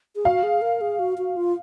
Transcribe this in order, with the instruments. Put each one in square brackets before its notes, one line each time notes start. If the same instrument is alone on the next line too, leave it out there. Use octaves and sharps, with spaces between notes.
[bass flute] G#4
[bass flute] F#4 [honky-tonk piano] F5
[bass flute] G#4
A#4
G#4
F#4
F#4
F4